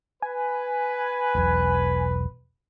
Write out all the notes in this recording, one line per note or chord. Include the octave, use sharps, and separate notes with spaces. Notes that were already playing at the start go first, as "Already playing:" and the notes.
B4 G#5
E1 B1